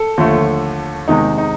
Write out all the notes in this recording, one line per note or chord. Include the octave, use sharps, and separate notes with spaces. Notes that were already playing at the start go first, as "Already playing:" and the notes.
Already playing: A4
D#2 D3 F3 A3
E2 C3 D#3 G#3 D#4
D#4